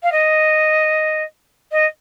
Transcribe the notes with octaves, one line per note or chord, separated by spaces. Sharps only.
F5
D#5
D#5